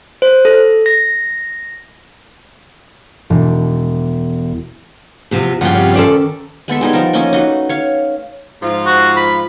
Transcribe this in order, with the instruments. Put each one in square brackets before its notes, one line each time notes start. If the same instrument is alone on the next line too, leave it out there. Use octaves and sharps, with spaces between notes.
[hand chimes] C5
A4
A#6
[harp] E1
[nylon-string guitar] E2 C3 F3
[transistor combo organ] G2 C#3 F3 [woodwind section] A#3 D4 [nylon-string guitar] F#5 G5
[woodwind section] C4 G4 C#5
[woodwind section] D#3 C#4 [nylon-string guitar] A4 C5 D5
[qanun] G#3 B3 A4 E5
G3 D#4 G#4
F3 A#4 A5
A3 A#3 C#4 D#5
D#4 F#4 B4
C#5 F5
[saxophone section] G#2 F3 F4
[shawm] F#4
B5